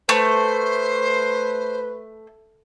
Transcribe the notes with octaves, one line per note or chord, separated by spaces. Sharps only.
A3 B4 C5